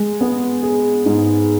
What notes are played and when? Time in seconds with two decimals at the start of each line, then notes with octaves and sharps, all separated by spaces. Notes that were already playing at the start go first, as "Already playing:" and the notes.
Already playing: G#3
0.21 B3
0.63 G#4
1.06 G#2